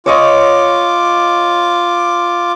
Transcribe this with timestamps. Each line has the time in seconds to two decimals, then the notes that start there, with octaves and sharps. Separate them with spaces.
0.06 F4 C#5 D#5 C#6 D6